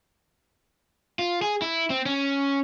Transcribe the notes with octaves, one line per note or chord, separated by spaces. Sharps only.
F4
G#4
E4
C4
C#4